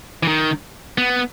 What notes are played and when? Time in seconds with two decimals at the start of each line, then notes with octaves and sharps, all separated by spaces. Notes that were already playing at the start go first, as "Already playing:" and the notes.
0.23 E3
0.28 D#3
0.98 B3